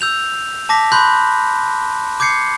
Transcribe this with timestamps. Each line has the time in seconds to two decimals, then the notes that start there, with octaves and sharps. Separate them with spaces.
0.01 E6 G6 F7
0.69 A5 D6 A#6 B6
0.92 B5 C6 F#6 G6
2.20 D6 G6 G#6 C7 C#7